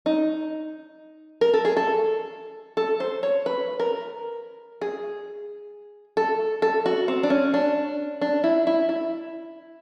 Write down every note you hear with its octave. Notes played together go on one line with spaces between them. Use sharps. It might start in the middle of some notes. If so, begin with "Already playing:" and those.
D#4
A#4
A4
G#4
A4
A4
C5
C#5
B4
A#4
G#4
A4
A4
F#4
C4
D4
C#4
D4
D4
E4
E4
E4